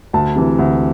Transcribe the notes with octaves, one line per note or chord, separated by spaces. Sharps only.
D2 A5
C3 E3
D2